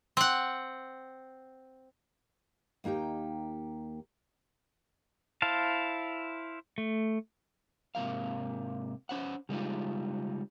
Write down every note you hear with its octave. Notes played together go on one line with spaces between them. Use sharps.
C4 F#5
D#2 A#3 D#4 G4 G5
E4 C5 F5 A5
A3
G#2 C3 G3 A#3 F5
C#4 C5 F#5
C#3 G3 G#3 D#4 F4